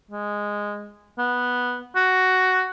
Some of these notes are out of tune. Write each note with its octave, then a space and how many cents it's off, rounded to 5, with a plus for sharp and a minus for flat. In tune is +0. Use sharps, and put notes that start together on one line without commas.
G#3 -10
B3 -5
F#4 +5